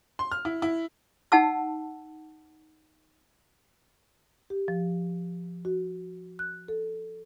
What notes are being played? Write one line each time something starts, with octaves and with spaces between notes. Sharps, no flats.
C6
F6
E4
E4
D#4 F#5 A5 E6
G4
F3
F#4
F#6
A4